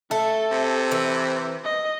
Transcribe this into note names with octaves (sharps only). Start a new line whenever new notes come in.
A3 A4
C3
E3
D#5